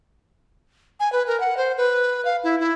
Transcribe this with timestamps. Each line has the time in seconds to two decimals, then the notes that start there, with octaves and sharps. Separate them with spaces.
1.00 G#5
1.13 B4
1.27 A#4
1.40 F#5
1.57 C5
1.77 B4
2.25 F5
2.44 E4
2.60 E4